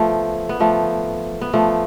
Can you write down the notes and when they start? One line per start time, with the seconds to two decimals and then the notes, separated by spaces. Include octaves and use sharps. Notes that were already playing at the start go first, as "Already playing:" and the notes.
Already playing: F3 A3 B3
0.49 B3
0.60 F3 A3
1.41 B3
1.53 F3 A3